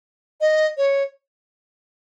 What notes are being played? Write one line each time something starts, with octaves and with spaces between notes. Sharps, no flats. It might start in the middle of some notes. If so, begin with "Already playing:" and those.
D#5
C#5